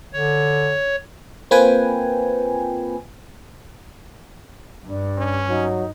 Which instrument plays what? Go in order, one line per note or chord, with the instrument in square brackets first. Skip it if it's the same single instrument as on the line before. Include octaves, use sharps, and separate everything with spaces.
[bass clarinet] D3 [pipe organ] C#5
[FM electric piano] A#3 C4 F4 B4 G5 G#5
[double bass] G2 [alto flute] D4
[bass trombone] C#4
[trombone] F#3 [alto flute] D#4